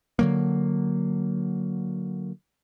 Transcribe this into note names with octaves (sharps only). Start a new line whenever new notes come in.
D3 F#3 A#3